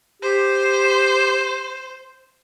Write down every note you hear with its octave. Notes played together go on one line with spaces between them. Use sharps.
G4 C5